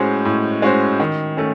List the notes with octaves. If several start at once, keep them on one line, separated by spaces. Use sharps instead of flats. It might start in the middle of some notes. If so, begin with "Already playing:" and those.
Already playing: A2 G#3 C#4 F#4 C5
A2
G#3 C#4 F#4 C5
D#3
A3 C#4